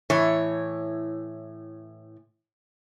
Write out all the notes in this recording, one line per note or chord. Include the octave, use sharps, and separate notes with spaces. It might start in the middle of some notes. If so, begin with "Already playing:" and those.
A2 E3 C#5